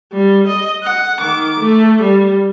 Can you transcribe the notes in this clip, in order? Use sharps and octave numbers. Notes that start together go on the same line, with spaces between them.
G3
D#5
F#5
D#3 D6
A3
G3